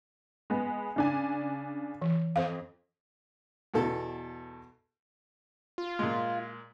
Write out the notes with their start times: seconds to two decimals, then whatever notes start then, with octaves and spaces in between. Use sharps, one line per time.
0.50 G#3 B3
0.96 C#3 D4 G#5
2.02 E3
2.36 F2 C5 F5
3.74 E2 B2 A4 A5
5.78 F4
5.99 A#2 G#3